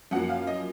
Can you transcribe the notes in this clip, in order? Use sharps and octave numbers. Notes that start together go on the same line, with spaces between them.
F#2 F3 A#3 F#5
F5
D#5